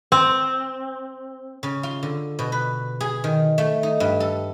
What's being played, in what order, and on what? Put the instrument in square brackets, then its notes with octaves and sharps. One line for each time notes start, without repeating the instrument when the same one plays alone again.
[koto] C4
[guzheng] C#3
F4
D3
B2
B4
G#4
D#3
A3
D#4
G2
A4